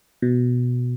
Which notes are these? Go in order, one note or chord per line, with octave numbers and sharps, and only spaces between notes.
B2